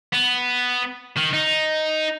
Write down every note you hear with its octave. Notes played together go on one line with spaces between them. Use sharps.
B3
D#3
D#4